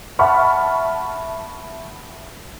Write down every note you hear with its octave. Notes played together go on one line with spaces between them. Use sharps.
E5 F#5 A5 B5 C#6 F6